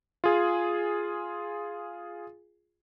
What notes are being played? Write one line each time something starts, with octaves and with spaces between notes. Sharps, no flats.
F4 G#4